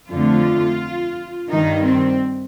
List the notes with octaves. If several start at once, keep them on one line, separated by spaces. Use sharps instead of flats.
F2 D3 A3 F4
G2 D#3 G3 D#4
C4